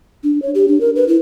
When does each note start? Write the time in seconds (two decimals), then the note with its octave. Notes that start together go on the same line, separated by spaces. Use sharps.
0.24 D4
0.42 C#5
0.55 G4
0.68 D4
0.81 A#4
0.96 B4
1.08 E4